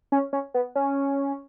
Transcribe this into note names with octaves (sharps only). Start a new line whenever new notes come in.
C#4
C#4
B3
C#4